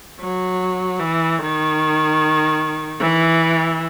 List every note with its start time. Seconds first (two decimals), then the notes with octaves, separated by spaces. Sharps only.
0.19 F#3
1.00 E3
1.39 D#3
3.00 E3